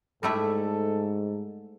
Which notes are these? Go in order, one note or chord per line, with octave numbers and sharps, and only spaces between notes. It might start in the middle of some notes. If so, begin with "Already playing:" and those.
G#2 G3 A3 E4 A4